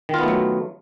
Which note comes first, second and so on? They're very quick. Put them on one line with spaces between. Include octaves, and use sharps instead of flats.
D#3 F4 B3 A3 F#3